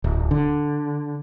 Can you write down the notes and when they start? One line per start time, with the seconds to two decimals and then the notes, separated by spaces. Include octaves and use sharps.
0.04 D1
0.31 D3